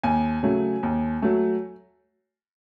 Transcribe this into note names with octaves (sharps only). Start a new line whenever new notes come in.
D#2 G#5
C#3 F#3 A3
D#2
F#3 A3